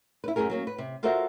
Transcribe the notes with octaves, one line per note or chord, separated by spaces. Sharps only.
E4 B4
F#2 A#2 A3 G#4 A#4
F#3 A#3 C#4
B4
C3
F4 F#4 A4 A#4 C5 E5